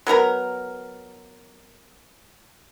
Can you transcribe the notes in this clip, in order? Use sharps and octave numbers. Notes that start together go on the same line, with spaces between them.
F#3 B3 A#4 A#5